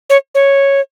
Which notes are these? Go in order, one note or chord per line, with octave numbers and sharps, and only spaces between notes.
C#5
C#5